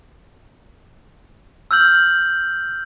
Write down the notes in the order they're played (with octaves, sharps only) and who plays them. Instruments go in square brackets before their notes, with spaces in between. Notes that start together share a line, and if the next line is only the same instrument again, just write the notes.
[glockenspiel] E6 F6 G6 F#7